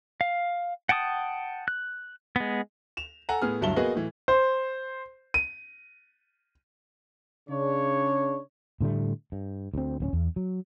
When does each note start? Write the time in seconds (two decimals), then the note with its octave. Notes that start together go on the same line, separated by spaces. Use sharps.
0.21 F5
0.89 F#5 G5 A5 D6 D#6
1.68 F#6
2.36 G#3 B3
2.97 E7 F7
3.29 A4 F#5 G#5 A#5
3.42 A2 B3 G#4 F6
3.61 D1 G2 F#3 E5 A5 G7
3.76 A#3 B3 F#4 G#4 B4 D#5
3.95 A2 E3
4.28 C5
5.34 D#7
7.49 C#3 D4 C#5
8.81 A2 D3 G3 A3
9.32 G2
9.74 D2 C4
10.00 D1 B3 C#4
10.13 E2
10.36 F#3